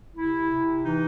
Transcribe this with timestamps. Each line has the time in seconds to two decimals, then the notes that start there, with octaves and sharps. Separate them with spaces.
0.16 C3 E4
0.50 C3
0.84 E3 D#4